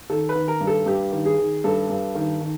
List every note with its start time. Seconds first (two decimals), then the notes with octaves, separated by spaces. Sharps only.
0.10 D#3 A4
0.29 B4
0.35 D#3
0.48 A#4
0.61 G2
0.67 A4
0.86 G2 G4
1.12 D#3
1.25 G#4
1.38 D#3
1.64 G2 A4
1.90 G2
2.15 D#3
2.41 D#3